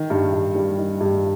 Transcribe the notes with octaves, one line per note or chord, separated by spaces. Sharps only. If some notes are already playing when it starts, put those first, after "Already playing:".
Already playing: D#3
G2
G2
G3
D#3
G2